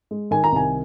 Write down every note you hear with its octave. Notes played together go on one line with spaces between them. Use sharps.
G#3
D#3 G#5
A#5
C2 G#5